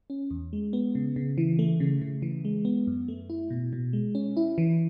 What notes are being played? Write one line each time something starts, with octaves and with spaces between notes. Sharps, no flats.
C#4
E2
G#3
B3
C#3
C#3
E3
A3
C#3
C#3
E3
G#3
B3
F#2
A3
E4
B2
B2
G#3
C#4
E4
E3